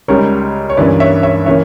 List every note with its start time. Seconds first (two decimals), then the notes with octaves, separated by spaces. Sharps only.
0.08 C#2 C#3 G3 A#4 C#5
0.70 C#5
0.77 G2 E3 A#3 C#4 B4 D5
1.00 C#5 E5
1.23 C#5 E5
1.46 C#3 E3 A#3 C#4 C#5 E5